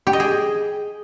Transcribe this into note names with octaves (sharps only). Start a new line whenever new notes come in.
G4
D#5
G#4